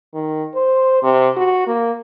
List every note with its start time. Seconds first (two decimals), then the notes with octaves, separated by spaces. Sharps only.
0.14 D#3
0.55 C5
1.03 C3
1.37 F#4
1.67 A#3